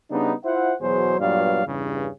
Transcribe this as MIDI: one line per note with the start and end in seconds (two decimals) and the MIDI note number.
0.11 0.34 49
0.11 0.34 55
0.11 0.34 59
0.11 0.34 62
0.11 0.34 63
0.45 0.74 64
0.45 0.74 65
0.45 0.74 72
0.45 0.74 76
0.45 0.74 78
0.81 1.18 40
0.81 1.18 47
0.81 1.18 54
0.81 1.18 68
0.81 1.18 72
1.19 1.66 43
1.19 1.66 46
1.19 1.66 54
1.19 1.66 59
1.19 1.66 74
1.19 1.66 77
1.67 2.09 40
1.67 2.09 43
1.67 2.09 49